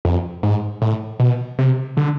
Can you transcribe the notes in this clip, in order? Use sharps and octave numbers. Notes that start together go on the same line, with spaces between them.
F2
G#2
A2
B2
C3
D3